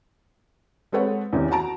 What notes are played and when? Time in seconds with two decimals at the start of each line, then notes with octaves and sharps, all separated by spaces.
0.92 G#3 C4 A4 B4 C#5 F#5
1.33 E2 C3 D#3 E3 B3 C#4
1.51 F#4 A5 A#5 D7